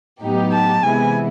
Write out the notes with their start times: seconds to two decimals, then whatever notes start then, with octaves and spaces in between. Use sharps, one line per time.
0.22 A2 F#3 B3 D#4 G4
0.52 A5
0.82 C3 E3 G#3 B3 E4 G#5